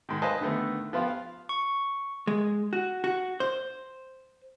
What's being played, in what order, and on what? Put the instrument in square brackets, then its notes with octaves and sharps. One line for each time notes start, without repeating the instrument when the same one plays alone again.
[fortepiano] G#2 D#3
B4 C5 D#5 F5 G#5 A5
D3 D#3 A3 B3
F3 B3 F4 F5 G5
F5
[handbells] C#6
[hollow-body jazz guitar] G#3
F#4
F#4
C5